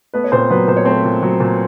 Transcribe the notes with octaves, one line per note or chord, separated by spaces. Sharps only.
A3 B3 B4
C#5
A#2 C4 C5
F#3 B3 B4
A#2 C5
C#5
A3 C4 C5
A#2
F#3
A#2